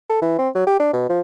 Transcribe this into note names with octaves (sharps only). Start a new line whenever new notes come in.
A4
E3
C4
F#3
G4
D4
B2
F3